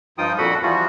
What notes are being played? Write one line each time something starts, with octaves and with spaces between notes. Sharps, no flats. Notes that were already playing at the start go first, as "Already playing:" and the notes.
G2 F3 D#4 F4 G5 D#6
F2 A#2 F#4 A4 F#5 B5
E3 F3 G3 F4 F#4